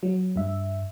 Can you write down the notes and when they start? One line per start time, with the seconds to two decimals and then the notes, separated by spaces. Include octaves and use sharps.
0.03 F#3
0.36 G2 E5